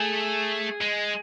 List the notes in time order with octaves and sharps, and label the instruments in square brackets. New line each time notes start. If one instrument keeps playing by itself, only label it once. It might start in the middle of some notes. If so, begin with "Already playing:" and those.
Already playing: [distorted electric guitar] A3 [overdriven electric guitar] G#4
[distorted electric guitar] G#3